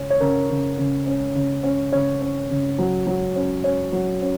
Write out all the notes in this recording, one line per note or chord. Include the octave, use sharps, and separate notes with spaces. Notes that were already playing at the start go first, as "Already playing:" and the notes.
Already playing: C#3 C#4
C#5
C#3 A#4
C#3
C#3
C#4
C#3
C#4
C#3 C#5
C#4
C#3
F#3
F#3
C#4
C#4 C#5
F#3
C#4